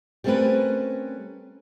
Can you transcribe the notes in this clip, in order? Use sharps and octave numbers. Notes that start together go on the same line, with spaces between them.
G3 A3 C4 C#4 A#4 B4